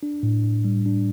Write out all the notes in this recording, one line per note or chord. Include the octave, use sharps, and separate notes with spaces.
D4
A2
A2
G3
D4